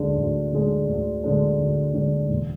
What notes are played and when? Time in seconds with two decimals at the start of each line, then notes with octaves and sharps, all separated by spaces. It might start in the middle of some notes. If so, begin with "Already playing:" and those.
Already playing: D2 D3 G#3 D4
0.17 D2
0.53 D3 G#3 D4
0.88 D2
1.24 D3 G#3 D4
1.59 D2
1.94 D3 G#3 D4
2.29 E1